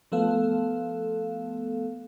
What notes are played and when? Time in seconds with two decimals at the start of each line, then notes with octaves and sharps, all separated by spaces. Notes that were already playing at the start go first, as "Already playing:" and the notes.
0.12 F3 A3 B3 A4 F5